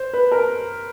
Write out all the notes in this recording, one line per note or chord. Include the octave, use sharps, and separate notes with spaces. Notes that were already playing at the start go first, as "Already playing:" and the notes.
Already playing: C5
B4
A#4